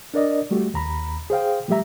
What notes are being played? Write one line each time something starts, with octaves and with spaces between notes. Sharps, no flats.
D4 A#4 D5 D#5
G3 A3 F#4 G4
D#2 A#5 B5
G#4 C5 F5 G5
F3 G3 A3 G4 E5 A#5